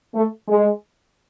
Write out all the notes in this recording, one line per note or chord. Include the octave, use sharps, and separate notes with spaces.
A3
G#3